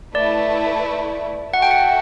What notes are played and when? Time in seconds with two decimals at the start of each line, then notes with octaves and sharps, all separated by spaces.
0.14 A3 E4 B4 D5
1.53 F#4 A4 E5 F#5
1.62 G5
1.71 F#5